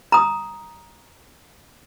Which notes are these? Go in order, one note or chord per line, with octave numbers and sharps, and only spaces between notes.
A#5 D#6